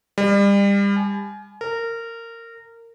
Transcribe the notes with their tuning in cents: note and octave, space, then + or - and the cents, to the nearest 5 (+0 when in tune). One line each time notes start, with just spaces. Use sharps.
G3 +35
G#5 +35
A#4 -20